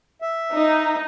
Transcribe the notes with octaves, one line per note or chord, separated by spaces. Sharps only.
E5
D#4